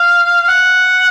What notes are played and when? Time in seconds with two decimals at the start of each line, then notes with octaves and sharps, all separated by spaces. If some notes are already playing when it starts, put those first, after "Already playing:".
Already playing: F5
0.48 F#5